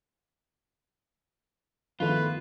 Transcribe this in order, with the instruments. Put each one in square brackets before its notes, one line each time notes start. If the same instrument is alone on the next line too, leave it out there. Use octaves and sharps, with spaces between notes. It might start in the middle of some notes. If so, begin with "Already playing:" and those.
[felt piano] D#3 A3 B3 [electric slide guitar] F3 F4 [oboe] B4